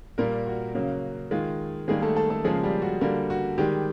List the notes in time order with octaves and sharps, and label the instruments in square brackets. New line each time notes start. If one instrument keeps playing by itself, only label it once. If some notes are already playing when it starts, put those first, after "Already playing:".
[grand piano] A#2 G3 A#3 A#4
F#4
C#3 F#3 A#3
D#3 G#3 F4
D#3 G3 G#3 A#3 G#4
A3 A4
A3 A4
A3 A4
C#3 F3 G#3 A#3 G#4
G3 G4
F#4
D3 G3 A#3 F#4
F#4
D#3 G3 G#3 G4